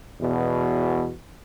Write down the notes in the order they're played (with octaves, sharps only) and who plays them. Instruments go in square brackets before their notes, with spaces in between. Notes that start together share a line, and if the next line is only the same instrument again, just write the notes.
[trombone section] E2 B2